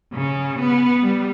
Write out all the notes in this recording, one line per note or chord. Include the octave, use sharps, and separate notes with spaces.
C#3
B3
G3